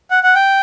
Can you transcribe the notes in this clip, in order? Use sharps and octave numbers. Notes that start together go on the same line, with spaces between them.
F#5
F#5
G5